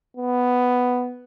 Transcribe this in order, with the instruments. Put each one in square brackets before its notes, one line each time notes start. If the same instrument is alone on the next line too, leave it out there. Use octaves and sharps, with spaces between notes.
[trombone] B3